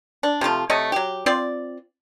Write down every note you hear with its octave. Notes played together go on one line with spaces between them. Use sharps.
D4
C3 F3 A3 F4
C3 A3 C#5 D#5
F#3 G4
C4 F4 D5